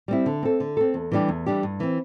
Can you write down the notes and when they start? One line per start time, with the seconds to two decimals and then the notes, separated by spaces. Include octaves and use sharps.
0.08 G3 C4 E4
0.26 D3
0.43 C4 A4
0.60 D3
0.77 C4 A4
0.94 E2
1.12 E3 G3 D4 G4
1.29 E2
1.46 E3 G3 D4 G4
1.63 G2
1.80 E3 C4